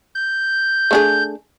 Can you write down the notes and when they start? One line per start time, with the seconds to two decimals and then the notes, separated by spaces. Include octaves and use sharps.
0.15 G6
0.91 A3 D4 G#4